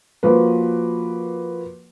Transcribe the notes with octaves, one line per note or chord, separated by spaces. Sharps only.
F3 A#3 F#4 B4